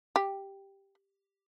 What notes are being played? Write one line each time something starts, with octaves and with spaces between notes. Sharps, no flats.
G4